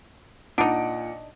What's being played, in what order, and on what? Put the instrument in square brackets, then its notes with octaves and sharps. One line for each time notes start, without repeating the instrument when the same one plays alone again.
[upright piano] A#2 F#5 D7 [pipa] D4 D#4